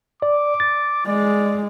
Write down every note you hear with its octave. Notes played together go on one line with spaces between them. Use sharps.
D5 D6
A6
G#3 D5